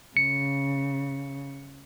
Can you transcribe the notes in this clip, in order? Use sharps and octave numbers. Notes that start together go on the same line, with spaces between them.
C#3 C#7